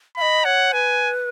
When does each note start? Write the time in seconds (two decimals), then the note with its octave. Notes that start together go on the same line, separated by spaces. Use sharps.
0.17 F5 B5
0.21 D#5
0.44 C#5 F#5
0.73 B4 G#5